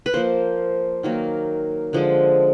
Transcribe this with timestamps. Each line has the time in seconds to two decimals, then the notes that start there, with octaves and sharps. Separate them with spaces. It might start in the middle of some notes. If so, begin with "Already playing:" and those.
0.06 B4
0.13 F3 A#3 C5
1.03 D#3 F#3 A#3
1.93 D3 F3 G#3